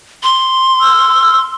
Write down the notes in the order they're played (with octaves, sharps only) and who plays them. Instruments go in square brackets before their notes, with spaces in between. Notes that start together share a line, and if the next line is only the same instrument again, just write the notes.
[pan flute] C6
[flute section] E6 F6